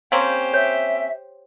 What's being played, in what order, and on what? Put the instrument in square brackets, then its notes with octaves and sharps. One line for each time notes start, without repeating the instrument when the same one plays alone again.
[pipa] A#3 C4 C#4 [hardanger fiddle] G4 C5 [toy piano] F5
[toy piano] C#5 [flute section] E5